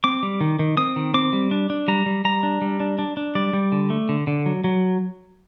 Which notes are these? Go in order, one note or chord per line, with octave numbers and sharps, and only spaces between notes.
C4 D6
G3
D#3
D#3
C4 D#6
D#3
C4 D6
G3
D4
D4
G3 A#5
G3
G3 A#5
D4
G3
D4
D4
D4
G3 D5
G3
D3
A3
D3
D3
F#3
F#3